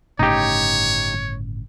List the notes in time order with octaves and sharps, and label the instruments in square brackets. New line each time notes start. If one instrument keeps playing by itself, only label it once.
[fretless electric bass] G1 A2 C#3 [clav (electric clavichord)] D#4 G4 [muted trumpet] C#5